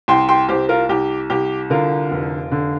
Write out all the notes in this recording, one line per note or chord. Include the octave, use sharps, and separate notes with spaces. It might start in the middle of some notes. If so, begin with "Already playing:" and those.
C2 G5 C6
G5 C6
C2 G4 C5
F4 A#4
C2 G4
C2 G4
D3 F4 A#4
F1
D3